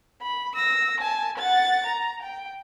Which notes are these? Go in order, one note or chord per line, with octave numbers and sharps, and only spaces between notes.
B5
E6 A#6
G#5 A5
F#5 A6
A#5
G5